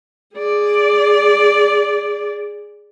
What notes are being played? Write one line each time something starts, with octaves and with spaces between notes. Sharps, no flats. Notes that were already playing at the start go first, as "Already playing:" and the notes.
G#4 D5